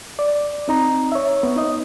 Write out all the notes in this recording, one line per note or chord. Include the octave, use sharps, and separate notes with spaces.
D5
C4 D#4 A#5
C#5 E5
B3
D#4 D#5